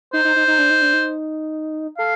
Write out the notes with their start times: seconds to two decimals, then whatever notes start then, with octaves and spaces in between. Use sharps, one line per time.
0.13 D#4 C5
0.25 D#4
0.36 D#4
0.48 D#4
0.59 D4
0.70 D#4
0.82 D4
0.93 D#4
1.98 A4 F5